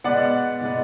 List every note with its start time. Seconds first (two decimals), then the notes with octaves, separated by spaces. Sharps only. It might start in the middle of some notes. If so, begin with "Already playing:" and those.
0.04 B2 G#3 B3 D5 F#5
0.61 B2 G#3 B3